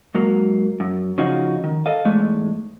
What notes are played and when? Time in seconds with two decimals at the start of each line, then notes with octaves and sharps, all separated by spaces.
0.15 G#2 F#3 A#3
0.80 F#2
1.18 C#3 F3 D#4 F#4
1.64 D#3
1.86 A4 D#5 F5
2.05 E2 G#2 G#3 A3